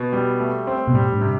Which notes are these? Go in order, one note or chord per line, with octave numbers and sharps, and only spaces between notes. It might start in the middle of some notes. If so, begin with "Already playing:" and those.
Already playing: B2
G3
A3
C4
B2
A2 G3
G2
C3